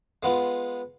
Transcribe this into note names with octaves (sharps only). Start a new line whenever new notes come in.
G#3 B3 F4